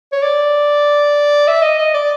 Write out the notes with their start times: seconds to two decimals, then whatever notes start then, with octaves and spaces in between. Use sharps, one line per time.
0.12 C#5
0.23 D5
1.48 E5
1.62 D#5
1.78 D#5
1.94 D5